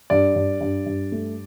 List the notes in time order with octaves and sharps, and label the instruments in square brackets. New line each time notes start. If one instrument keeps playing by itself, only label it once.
[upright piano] G2 [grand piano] D5
[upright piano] G2
G2
G2
A3